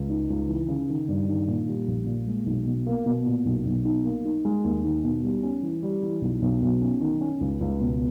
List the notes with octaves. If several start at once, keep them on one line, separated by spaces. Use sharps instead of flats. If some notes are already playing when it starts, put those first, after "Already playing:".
Already playing: C#2
D#4
C#2
E3
C#3
D#3
G2
D#3
A#2
G3
A#1
A#2
G#3
B1
B2
A#3
B2
A#2
B1
B1
D#4
A#3
D#4
G#3
D#2
D#3
B2
G3
C#4
E3
G3
E3
B1
B1
B1
C#4
D#3
C#4
C#2
C#2
B2